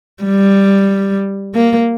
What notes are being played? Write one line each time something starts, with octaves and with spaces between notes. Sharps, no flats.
G3
A#3